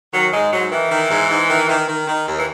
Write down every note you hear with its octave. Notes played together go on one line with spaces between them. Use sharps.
D#3 F#3
G#2 G#3
G#2 F#3
D#3 E3
D#3
G#2
G#2
D#3
D#3
D#3
D#3
D#2
E3